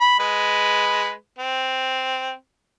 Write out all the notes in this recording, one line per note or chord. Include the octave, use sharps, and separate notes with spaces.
B5
G#3 B4
C4